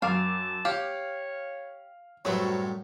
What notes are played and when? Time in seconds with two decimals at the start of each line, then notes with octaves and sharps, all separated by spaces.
0.02 F#2 A#4 F5 A5 D6
0.65 G4 C#5 F5
2.25 F#2 A2 F#3 G3 C4 B4 C#5